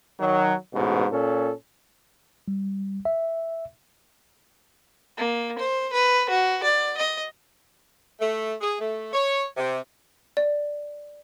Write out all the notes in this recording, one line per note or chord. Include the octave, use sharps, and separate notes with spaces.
D#3 F#3
A1 G#2 B2
A#2 C#4 A4
G3
E5
A#3
C5
B4
F#4
D5
D#5
A3
G#4
A3
C#5
C3
D5